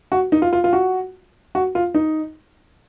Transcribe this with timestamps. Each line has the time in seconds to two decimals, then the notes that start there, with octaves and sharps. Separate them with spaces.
0.12 F#4
0.32 D#4
0.42 F4
0.53 F4
0.64 F4
0.73 F#4
1.55 F#4
1.75 F4
1.94 D#4